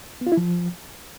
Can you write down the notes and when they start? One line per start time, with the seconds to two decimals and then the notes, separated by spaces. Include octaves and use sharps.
0.21 B3
0.27 F4
0.32 E4
0.37 F3